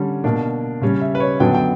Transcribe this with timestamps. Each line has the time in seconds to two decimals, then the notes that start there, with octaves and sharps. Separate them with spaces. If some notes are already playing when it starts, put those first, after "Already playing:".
Already playing: D3 G3 C#4
0.24 B2 A#3 D4
0.82 C#3 G3 C#4
1.01 E5
1.15 B4
1.20 C#5
1.40 F#2 D3 F#3 B3 D4 G5
1.54 G5